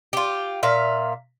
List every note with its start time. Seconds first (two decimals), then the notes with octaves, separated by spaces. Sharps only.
0.13 F4 G4
0.63 A#2 E5 F5